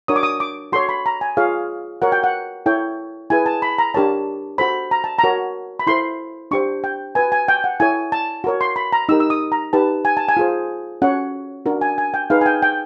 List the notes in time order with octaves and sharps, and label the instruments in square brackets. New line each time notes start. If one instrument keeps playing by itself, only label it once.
[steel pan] D4 F#4 A#4 C#5 D#6
D6
D#6
D6
F#4 A4 C#5 C6
B5
A#5
G#5
F4 G#4 C#5 F5
F#4 A#4 C#5 F#5
G5
F#5
E4 A4 C#5 G5
E4 G#4 B4 G#5
A5
B5
A#5
D4 G4 A#4 C#5 A5
F#4 A4 C5 B5
A#5
A5
A#5
F#4 A#4 C#5
B5
E4 A4 C5 C6
D4 G4 C5 C#6
G5
F#4 B4 G#5
G#5
G5
F#5
E4 A4 C#5 G#5
A5
F#4 A#4 C#5
C6
B5
A#5
D#4 G4 A#4 E6
E6
D#6
A#5
D#4 G4 B4 A5
G#5
A5
G#5
F4 G#4 C5
C#4 F#4 A4 C#5 F#5
D4 F#4 A#4
G#5
G#5
G5
D#4 G#4 B4 F5
G#5
G5
G5